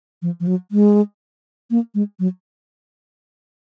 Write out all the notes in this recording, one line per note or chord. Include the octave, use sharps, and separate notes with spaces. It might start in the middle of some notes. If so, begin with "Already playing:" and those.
F3
F3
F#3
G#3
A#3
G#3
F#3